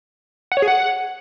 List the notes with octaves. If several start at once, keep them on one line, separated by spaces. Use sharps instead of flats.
F#5
C#5
G#4
F#5